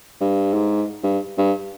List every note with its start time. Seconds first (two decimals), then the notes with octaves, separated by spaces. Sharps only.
0.21 G2
0.54 G#2
1.04 G2
1.38 G2